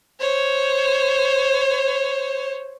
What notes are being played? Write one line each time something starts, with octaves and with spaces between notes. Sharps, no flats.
C5 C#5